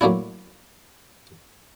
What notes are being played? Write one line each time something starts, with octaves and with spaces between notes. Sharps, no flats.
F#3 A3 A#3 D4 E4